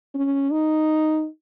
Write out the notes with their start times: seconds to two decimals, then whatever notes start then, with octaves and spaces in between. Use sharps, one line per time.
0.15 C#4
0.51 D#4